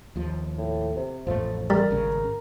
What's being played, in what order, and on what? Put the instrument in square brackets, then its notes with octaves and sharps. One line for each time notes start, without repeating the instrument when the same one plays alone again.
[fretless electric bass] D#2 F3
[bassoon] A2
C3
[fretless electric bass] A1 F2 A3 [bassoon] F3
[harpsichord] G3 [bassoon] A#4
[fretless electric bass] G#1 C#3